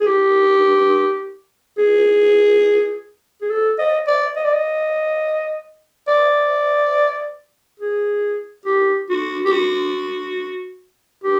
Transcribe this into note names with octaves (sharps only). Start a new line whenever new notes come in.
G#4
G4
G#4
G#4
A4
D#5
D5
D#5
D5
D#5
D5
G#4
G4
F#4
G4
F#4
G4